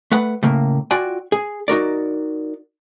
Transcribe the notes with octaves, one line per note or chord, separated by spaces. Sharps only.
A3 B4 F#5
A2 C#3 A#3
F4 F#4 D5 G5 G#5
G#4
D#4 F#4 A#4 D5